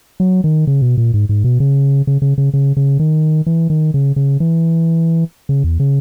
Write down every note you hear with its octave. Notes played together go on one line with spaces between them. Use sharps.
F#3
D#3
C#3
B2
A#2
G#2
G#2
B2
C#3
C#3
C#3
C#3
C#3
C#3
D#3
E3
D#3
C#3
C#3
E3
C#3
E2
C#3